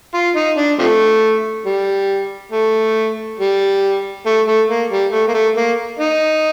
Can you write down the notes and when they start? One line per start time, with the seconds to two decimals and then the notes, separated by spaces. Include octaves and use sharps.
0.14 F4
0.36 D#4
0.57 D4
0.79 C3 F3 A3
1.66 G3
2.52 A3
3.39 G3
4.26 A3
4.47 A3
4.69 A#3
4.90 G3
5.12 A3
5.28 A#3
5.34 A3
5.56 A#3
5.99 D#4